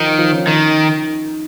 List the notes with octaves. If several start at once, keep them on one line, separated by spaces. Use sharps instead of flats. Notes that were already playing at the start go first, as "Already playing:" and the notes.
Already playing: D#3 F3
F3
C#4
D#3 D#4